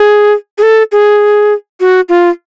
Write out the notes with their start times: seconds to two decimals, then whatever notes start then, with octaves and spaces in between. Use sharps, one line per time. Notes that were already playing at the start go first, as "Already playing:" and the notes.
Already playing: G#4
0.58 G#4
0.63 A4
0.92 G#4
1.80 F#4
2.09 F4